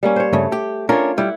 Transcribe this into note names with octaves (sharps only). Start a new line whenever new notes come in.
G3 A#3 C#4
C5 C#5
G2 C#3 A3
G4
C#4 D4 F4 A#4 C#5
G3 E4 F#5